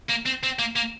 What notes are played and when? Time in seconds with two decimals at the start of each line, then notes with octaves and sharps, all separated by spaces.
0.10 A#3
0.26 C4
0.43 C4
0.59 A#3
0.76 A#3